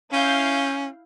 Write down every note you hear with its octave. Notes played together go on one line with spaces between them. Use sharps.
C#4 E4 F5 G6